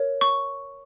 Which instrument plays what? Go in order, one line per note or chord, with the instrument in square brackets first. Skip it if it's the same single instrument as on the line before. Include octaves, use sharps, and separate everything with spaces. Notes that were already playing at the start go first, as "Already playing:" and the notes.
Already playing: [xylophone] A#4 C#5
C#6